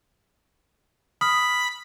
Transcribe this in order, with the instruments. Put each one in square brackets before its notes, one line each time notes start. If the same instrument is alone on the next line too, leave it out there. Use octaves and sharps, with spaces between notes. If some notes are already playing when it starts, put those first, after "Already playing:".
[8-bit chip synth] B5 B6 [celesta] D#6 F6